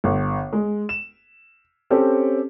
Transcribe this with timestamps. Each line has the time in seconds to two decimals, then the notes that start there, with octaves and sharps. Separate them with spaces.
0.04 G1
0.53 G#3
0.89 E7
1.90 C4 C#4 G4 A4